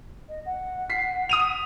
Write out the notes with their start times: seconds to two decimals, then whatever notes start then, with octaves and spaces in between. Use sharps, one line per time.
0.29 D#5
0.46 F#5
0.90 B6 C7
1.29 D#6 D#7 F7